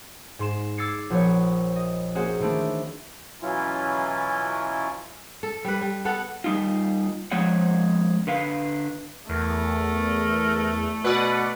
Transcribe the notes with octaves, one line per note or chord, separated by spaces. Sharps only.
G#2 C6 E7
D6 E6 G#6 A6 C7 C#7
A#1 F3 B3 C#5
D#5
A#3 C4 C#4 F#4 G#4
D#3 E3 A3 C4 D4
B2 E3 F#3 C#4 E4 F4
A4
G3 B4
G3
B3 A4 F#5
G3 D#4 F4
F3 G#3 C4 C#5 F#5
D3 B4 F5
E2 A3 A#4
B2 B4 D5 F#5